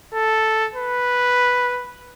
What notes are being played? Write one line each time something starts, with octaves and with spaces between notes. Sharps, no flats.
A4
B4